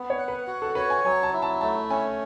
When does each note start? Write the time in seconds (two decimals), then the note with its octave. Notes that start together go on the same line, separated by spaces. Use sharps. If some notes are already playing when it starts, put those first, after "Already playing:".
Already playing: B3
0.10 C#5
0.18 F#5
0.28 B4
0.47 F#4
0.62 A4
0.75 B4 C#5
0.90 G#5
1.04 F#3 G#5
1.23 A5
1.33 E4
1.42 A5
1.61 A3 A5
1.90 C#4 G#5